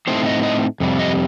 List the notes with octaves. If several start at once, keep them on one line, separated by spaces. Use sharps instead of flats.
A2 A3 C4 D#4 C5
D#5
D#5
F2 C3 G3
D#5